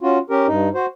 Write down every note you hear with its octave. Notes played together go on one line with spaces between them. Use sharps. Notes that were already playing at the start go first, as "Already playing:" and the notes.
C#4 F4 F#4
C#4 G4 A#4
G2 D#4
F#4 C5